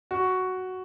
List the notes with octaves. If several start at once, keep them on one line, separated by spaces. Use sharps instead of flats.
F#4